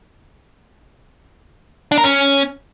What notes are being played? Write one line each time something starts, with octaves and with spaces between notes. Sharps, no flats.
D4
A#4
C#4